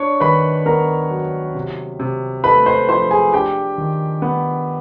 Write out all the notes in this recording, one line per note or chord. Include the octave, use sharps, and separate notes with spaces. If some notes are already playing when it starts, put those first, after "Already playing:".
Already playing: D4 C#5 C#6
D#3 B4 B5
B3 A#4 A#5
F#3
C3
C3
A3 B4 B5
C5 C6
F3 C5 C6
G#4 G#5
D4 G4 G5
D#3
B3